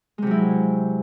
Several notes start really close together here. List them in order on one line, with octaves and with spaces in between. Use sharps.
G#3 C3 F#3 E4